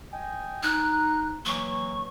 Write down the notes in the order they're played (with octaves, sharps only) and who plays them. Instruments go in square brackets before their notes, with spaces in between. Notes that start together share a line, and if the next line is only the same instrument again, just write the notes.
[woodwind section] D#5 G5 G#5
[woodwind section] D#4 [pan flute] F#6
[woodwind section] E3 F#3 A#3 [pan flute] C#6